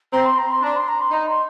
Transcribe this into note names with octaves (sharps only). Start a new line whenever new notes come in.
C4 A#5
C6
A#5
C6
D4 A#5
C6
A#5
C6
D#4 A#5
C6